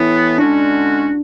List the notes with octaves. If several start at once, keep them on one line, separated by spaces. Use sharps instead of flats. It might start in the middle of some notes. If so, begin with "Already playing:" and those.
Already playing: A2 E3 B3 E4
D3 G#3 C#4 D4 F#4